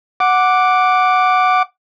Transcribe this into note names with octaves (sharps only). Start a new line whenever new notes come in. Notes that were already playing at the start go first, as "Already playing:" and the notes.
F#5 D6